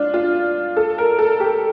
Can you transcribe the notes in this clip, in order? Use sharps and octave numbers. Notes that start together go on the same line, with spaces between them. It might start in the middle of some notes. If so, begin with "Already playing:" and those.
Already playing: D4 F4
F4
A4
A#4
A4
G4